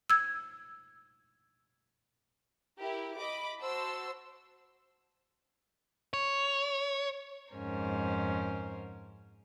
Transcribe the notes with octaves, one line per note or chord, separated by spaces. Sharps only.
E6 G#6
E4 G4 A#4
D#5 B5 D6
F#4 C5 A5 C6 E6
C#5
F2 G#2 C#4 A#4 C5